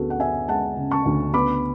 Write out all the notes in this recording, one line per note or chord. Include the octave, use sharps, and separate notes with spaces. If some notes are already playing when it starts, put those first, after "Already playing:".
Already playing: D2 B3 F#4 G#4 A4
F#5
B3 E5 G#5
G#3 F#5 A5
C#3
A5 C#6
D2
B3 B5 D6